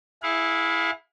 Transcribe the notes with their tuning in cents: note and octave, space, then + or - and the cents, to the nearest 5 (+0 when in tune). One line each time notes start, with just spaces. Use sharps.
E4 +0 G#4 +0 F5 +35